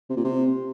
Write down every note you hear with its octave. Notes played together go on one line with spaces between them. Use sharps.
C3
A#2
C3